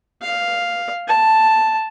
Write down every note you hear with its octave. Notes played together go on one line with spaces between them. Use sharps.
F5
A5